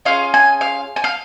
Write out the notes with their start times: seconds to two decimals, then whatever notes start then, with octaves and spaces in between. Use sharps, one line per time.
0.05 C#4 F4 G#4 F5
0.34 G#5
0.61 F5
0.96 G#5
1.04 F5